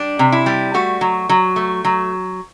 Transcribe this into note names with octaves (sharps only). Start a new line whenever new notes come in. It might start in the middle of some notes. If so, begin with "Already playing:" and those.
Already playing: G3 D4
C3
E4
G3
A3 F#4
F#3
F#3
A3
F#3